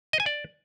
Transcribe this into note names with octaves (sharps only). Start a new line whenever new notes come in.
D#5
G#5
D5